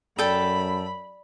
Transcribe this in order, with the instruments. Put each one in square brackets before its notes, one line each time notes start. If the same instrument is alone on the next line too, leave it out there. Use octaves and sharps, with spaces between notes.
[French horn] F#2 [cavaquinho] A4 G5 [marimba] D5 [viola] B5